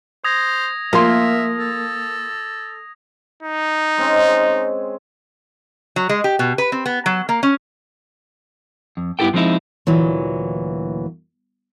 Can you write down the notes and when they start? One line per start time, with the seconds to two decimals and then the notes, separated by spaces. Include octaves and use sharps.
0.24 C5 D#6 G#6 A#6
0.93 F3 A#3 F4 E5 C6
1.59 A4
3.43 D#4
3.97 G#3 C4 C#4
5.96 F#3
6.09 G#3
6.24 G4
6.39 B2
6.58 B4
6.72 C4
6.86 B3
7.06 F#3
7.29 A#3
7.43 C#4
8.97 F2
9.19 G2 B3 E4 G4 A4 G5
9.34 F3 G#3 C4 D#4 E4
9.87 D2 A#2 E3 F#3